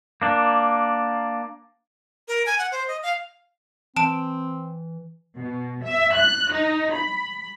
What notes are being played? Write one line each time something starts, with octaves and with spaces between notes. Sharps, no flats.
A#3 D4
A#4
G#5
F#5
C5
D#5
F5
E3 C4 A5 D7
B2
E5
F#6
D#4
B5